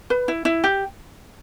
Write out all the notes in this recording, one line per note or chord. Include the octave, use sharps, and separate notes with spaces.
B4
E4
E4
G4